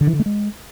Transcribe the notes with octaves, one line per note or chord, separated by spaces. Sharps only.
D3
E3
D3
A3
G#3